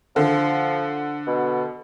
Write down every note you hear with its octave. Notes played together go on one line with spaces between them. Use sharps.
D3 F3
B2